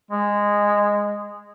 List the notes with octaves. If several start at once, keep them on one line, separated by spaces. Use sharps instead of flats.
G#3